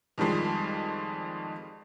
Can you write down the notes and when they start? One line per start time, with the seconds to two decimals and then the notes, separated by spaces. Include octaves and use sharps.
0.18 F2 D#3 F3 G3 G#3